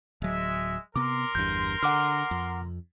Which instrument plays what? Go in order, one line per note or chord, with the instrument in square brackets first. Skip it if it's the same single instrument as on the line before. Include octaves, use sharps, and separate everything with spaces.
[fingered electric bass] D1 F#3 [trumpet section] G#3 E5
[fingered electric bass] C3 B3 [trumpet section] A#4 C6 [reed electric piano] D6
[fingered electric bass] G1 E2 G2 [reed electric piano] G6
[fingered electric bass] D3 [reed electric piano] F#5 D6 F6
[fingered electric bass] F2